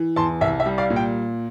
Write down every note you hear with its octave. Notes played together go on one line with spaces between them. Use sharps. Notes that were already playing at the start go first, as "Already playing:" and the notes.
Already playing: E3
E2 A5 C6
C2 E5
E5
G3
D5 F5
A#2
G5